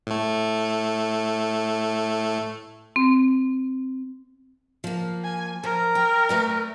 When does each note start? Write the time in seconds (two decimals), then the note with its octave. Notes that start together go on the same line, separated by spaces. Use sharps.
0.07 A2 A3
2.96 C4
4.84 F3 A#3
5.24 G#5
5.64 F3 A#4
5.95 G5
6.29 A3 B4 D5